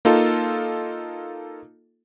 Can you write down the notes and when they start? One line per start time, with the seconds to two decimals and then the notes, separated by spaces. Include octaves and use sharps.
0.05 A#3 D#4 F4 A4